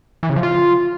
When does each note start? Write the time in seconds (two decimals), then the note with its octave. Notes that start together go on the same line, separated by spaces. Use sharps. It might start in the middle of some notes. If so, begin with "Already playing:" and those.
0.23 E3
0.30 C#3
0.36 F3
0.43 F4